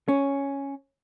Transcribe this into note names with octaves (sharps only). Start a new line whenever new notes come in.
C#4